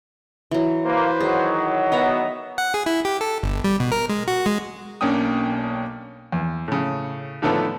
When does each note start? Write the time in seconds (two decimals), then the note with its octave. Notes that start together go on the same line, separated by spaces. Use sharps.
0.51 E3 F#3
0.85 A#3 B4 C5
1.20 D#3 F#3 G#4
1.92 B3 D#5 E5 A#5
2.58 F#5
2.74 G#4
2.86 E4
3.05 G4
3.21 A4
3.43 G1
3.64 G3
3.80 B2
3.92 A#4
4.09 G#3
4.28 F#4
4.46 G#3
5.01 B1 A#3 C#4 D4 G5 D#6
6.32 E2
6.68 A2 C#3
7.42 A2 D3 D#3 F3 A3 B3